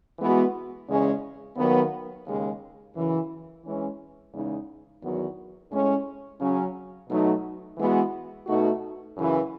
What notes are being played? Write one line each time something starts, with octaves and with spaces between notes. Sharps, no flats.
E3 G#3 B3 F#4
E2 C#3 G#3 C#4
D#2 D#3 F#3 B3
D#2 C#3 G#3
F#2 C#3 E3
E3 G#3 C#4
E2 C#3 G#3 D#4
E2 D#3 F#3 B3 F#4
A2 G#3 C#4
C#3 F#3 C#4
B2 F#3 A3 D#4
E3 G#3 B3 F#4
B2 A3 D#4 F#4
F#2 C#3 E3